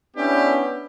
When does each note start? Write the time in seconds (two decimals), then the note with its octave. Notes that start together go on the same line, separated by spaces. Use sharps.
0.15 B3 C#4 D4 E4 G4